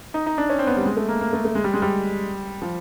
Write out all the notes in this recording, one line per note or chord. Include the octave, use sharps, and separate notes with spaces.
D#4
D#4
D4
C#4
C4
B3
G3
G#3
A3
A#3
A#3
A3
A3
G#3
G3
G#3
G3
F3